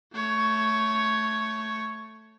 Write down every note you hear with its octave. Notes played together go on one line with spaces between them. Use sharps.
A3 C#5